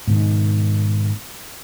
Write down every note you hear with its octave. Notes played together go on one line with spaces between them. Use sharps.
G#2 B2 D#3